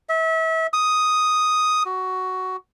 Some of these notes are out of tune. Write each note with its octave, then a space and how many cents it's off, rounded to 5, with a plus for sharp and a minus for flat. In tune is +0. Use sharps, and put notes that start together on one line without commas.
E5 -30
D#6 +0
F#4 +10